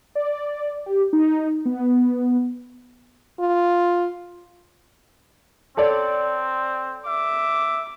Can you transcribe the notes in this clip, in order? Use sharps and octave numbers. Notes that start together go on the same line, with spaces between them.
D5
G4
D#4
B3
F4
C4 A4 C#5 D5
E5 D6